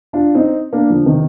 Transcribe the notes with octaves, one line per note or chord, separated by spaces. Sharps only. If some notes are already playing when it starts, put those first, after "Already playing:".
D4 F4
C4 D#4
A#3 D4
D3 F3
C3 D#3